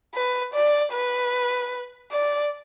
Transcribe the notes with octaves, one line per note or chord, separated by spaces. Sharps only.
B4
D5
B4
D5